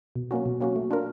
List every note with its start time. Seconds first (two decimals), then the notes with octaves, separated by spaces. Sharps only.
0.15 B2
0.31 F#3 A#3 C#4 F#4
0.46 B2
0.60 F#3 A#3 C#4 F#4
0.76 A3
0.91 D4 F4 A#4